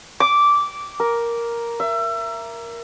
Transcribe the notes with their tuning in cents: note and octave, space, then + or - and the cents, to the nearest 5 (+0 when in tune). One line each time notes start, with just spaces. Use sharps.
D6 -10
A#4 +5
E5 +30